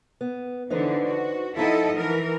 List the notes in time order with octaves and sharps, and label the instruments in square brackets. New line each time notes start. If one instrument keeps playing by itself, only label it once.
[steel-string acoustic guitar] B3
[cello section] D3 E3 [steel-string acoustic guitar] D#4 B4 C5
[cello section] F#4
[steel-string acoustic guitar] F3 D#4 F#5 [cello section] E4 A4 D#5
[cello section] E3 A#4